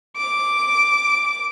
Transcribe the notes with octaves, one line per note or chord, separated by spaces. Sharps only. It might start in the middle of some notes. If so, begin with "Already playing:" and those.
D6